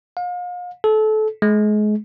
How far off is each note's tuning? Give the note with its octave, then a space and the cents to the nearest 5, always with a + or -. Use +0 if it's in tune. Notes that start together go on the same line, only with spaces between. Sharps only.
F5 +40
A4 -25
G#3 +30